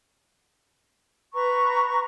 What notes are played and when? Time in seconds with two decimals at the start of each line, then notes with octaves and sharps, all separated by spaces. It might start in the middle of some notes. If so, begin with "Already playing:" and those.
1.34 B4 A#5 C#6